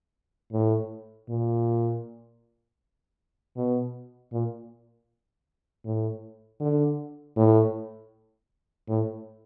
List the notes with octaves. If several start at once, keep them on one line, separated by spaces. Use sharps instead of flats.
A2
A#2
B2
A#2
A2
D3
A2
A2